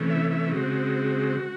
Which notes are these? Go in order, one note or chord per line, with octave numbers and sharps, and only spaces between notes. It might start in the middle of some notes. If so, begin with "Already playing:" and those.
Already playing: C3 E3 A3 C#4
E5
E5
C#3 G#3 C4 F#4